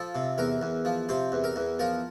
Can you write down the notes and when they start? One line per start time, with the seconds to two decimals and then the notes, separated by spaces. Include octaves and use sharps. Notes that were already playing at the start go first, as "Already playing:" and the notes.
Already playing: F3 A4
0.15 C3
0.38 E2 A#4
0.62 E2
0.85 F3
1.09 C3 C5
1.32 E2
1.44 A#4
1.56 E2
1.79 F3 A#4